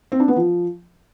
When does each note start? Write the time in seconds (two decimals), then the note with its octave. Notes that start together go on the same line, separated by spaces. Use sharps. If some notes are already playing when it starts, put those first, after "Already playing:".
0.12 C4
0.20 D4
0.28 B3
0.36 F3